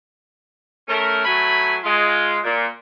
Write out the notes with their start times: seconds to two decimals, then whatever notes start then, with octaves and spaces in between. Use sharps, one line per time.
0.88 A3 C#4 A#4
1.25 F#3 A3 G#5 B5
1.84 G#3 F4
2.44 A#2